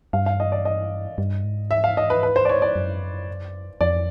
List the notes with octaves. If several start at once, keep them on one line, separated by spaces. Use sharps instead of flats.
G2 F5
F5
D#5
D5
D#5
G2
G#2
E5
F5
D#5
B4
B4
C5
D5
C#5
D5
F#2
F2 D5